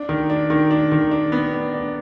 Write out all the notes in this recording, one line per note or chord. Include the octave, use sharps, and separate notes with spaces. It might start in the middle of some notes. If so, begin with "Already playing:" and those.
Already playing: D4
D#3
D4
D#3
D4
D#3
D4
B3
D4
D4